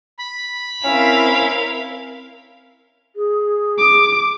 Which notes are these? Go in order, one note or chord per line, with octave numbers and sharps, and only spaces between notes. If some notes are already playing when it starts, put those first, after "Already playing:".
B5
C4 C#4 E4 A#4 F5
G#4
D6